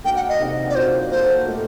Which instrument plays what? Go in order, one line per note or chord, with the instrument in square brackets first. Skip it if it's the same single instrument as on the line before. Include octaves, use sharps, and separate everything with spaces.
[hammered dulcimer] A#3 D4 F#4 [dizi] G5
[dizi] F#5
D#5
[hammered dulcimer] C3 D#3 F#3
[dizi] D5
[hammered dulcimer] A#2 F#3 A#3 F#4 [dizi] C5
[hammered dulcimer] A#3 F#4 A4 [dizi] C5
[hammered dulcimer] A#2 A3 D#4 G4